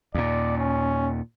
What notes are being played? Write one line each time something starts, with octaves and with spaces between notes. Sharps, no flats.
D#2 A#2 D5
C#4